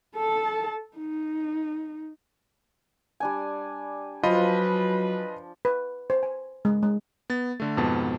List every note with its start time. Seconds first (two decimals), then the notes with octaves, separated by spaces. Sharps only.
0.15 A4 A5
0.97 D#4
3.20 G3 D4 G#5
4.23 F3 F#3 F4 B4 D#5 B5
5.65 B4
6.10 C5
6.23 G#5
6.65 G#3
6.83 G#3
7.30 B3 A6
7.60 D3 A3
7.77 F2 G#2 B2 B3 A5